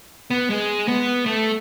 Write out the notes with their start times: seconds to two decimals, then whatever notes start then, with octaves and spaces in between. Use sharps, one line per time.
0.30 B3
0.50 G#3
0.88 B3
1.26 A3